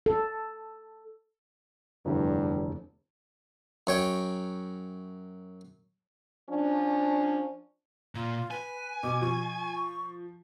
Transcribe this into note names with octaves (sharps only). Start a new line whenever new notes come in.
A4
F1 E2 G2 D3
F#2 C#5 G5
F3 C#4 D4
A#2 F4
B4 G#5
B2 D6
F3 C#6